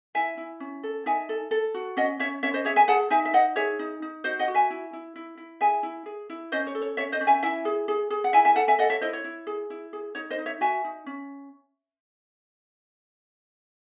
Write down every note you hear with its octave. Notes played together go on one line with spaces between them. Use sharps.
E4 E5 G#5
E4
C#4
A4
D#4 E5 G#5
A4
A4
F#4
C#4 D#5 F#5
C#4 C#5 E5
C#4 C#5 E5
C5 D#5
G#4 C#5 E5
E5 G#5
G#4 F#5 A5
D#4 E5 G#5
E5
D#4 D#5 F#5
G#4 C#5 E5
D#4
D#4
F#4 C5 D#5
D#5 F#5
F#4
E5 G#5
E4
E4
E4
E4
G#4 E5 G#5
E4
G#4
E4
C#4 C5 D#5
C#5
A4
C#5
C#4 C#5 E5
C5 D#5
C#4
E5 G#5
E4 E5 G#5
G#4
G#4
G#4
F#5
E4 E5 G#5
E5 G#5
A4 F#5 A5
E5 G#5
A4 D#5 F#5
C#5 E5
E4 C5 D#5
C#5
E4
G#4
E4
G#4
D#4 C#5
C5 D#5
D#4
C#5 E5
F#4 E5 G#5
D#4
C#4